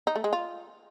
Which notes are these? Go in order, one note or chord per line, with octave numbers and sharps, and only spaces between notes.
D#4
A3
G#3
F4